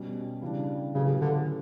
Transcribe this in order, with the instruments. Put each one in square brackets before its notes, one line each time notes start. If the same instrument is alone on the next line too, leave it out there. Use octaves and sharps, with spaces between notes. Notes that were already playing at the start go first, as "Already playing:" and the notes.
Already playing: [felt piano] B2 G3 C#4
C#3 E3 G3 D4
[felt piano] A2 F#3 C#4 G4 B4 [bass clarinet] C#3
[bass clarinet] D3